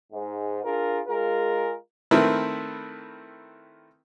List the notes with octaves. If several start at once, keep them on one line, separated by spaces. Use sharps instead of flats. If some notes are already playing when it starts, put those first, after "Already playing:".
G#2
D4 F4 G#4 A#4
G#3 F4 G#4 A#4
D#3 A3 C4 E4 A#4 B4